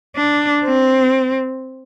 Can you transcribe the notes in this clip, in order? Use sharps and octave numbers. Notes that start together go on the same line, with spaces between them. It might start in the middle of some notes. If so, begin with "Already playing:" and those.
D4
C4